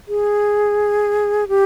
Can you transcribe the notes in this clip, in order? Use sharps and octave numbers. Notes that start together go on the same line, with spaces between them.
G#4
G4